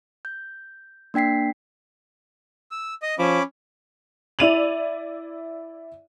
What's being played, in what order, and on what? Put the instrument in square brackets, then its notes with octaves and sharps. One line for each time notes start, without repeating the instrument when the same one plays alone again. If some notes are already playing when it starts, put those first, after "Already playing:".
[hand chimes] G6
A#3 D4 G5 B6 C7
[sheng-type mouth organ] E6
D#5 D#6
[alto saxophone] F3 [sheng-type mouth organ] C#4 B5 D6
[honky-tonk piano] E4 D5 D#7 F7 F#7